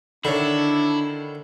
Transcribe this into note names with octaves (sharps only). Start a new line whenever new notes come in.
D3 D#3 D4 E4 A4 C#5